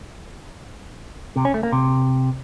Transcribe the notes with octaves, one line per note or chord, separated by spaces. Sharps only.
C3
C#4
A3
A#3
C3